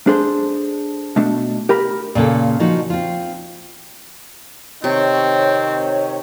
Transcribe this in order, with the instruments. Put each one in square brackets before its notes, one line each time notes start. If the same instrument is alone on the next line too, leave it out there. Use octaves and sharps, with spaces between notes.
[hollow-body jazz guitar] D4 G#4 A4 C5
B2 A3 D4
G4 A#4 B5
[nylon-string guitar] A#2 C#3 A#3 A4
F3 D#4 F#4
C4 F4
[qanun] C3 [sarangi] D#3 [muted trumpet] C4 [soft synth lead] C#5